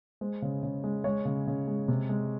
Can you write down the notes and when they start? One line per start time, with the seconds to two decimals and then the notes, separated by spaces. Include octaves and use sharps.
0.21 G#3 C5
0.42 C#3
0.63 C#3
0.84 G#3
1.04 G#3 C#5
1.25 C#3
1.47 C#3
1.67 G#3
1.88 C3
2.09 G#3